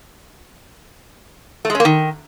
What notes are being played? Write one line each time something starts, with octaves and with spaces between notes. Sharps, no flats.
A3
G#3
C#4
A#3
D#3